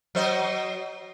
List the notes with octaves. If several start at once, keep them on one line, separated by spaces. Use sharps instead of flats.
F#3 C5 D#5